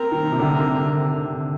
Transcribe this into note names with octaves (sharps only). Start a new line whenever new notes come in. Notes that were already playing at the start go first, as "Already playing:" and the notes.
Already playing: C4 A#4
D#3
C3
D3